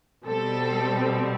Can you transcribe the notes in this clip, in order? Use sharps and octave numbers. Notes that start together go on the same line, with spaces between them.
B2 G3 C4 A4